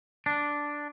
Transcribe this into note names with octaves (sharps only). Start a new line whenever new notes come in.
D4